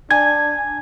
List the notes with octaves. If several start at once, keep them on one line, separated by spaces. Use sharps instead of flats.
D4 G#5 G#6